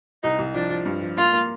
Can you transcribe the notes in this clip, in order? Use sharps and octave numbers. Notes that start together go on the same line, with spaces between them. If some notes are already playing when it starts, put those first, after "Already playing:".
C2 D#4
C2
F3 D4
F3
G2
F3
A#3 F4
A#3